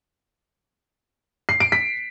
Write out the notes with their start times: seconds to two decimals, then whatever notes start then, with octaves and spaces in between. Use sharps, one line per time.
1.49 C7
1.60 D7
1.72 B6